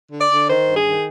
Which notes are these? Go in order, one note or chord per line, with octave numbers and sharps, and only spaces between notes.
D3
D5
D3
D#3 C5
G2
G#4
D#3